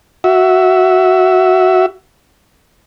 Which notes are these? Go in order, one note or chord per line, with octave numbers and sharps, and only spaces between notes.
F#4 E5